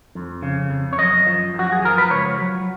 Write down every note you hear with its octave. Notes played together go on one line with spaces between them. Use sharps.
F2
C#3
F2
C#5
F#2 D#5
F3
F#2 F#4
G#4
F3 A#4
B4
C#2 C#5
F#3